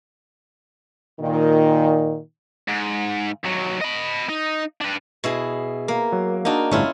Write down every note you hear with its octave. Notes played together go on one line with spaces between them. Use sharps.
A#2 D#3
G#2
D#2 F#3
D#5 B5
D#4
D4 B4
B2 E4 G#4
A#3
F#3
A#3 D4 D#4 F#4 F5
G1 A2 C#4 E4 F4